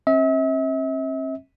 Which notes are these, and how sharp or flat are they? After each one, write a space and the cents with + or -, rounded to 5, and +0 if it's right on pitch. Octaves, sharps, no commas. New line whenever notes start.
C4 +45 E5 -40